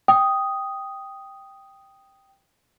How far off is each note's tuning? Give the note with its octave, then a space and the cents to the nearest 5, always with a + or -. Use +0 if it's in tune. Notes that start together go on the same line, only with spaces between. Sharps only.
G5 +0 D#6 +0